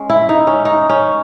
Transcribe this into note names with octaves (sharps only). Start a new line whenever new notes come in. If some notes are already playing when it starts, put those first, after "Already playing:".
Already playing: G#3 C#4
E4
D#4
C#4
D#4
C#4